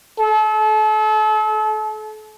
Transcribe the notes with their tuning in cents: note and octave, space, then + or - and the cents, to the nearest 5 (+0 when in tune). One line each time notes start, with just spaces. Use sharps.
A4 -35